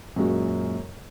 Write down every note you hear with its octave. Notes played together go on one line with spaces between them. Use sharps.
F#2 A#2 G#3 F#4